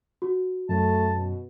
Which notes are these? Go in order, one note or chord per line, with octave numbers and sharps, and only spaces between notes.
F#4
F#2 A3 A5
B2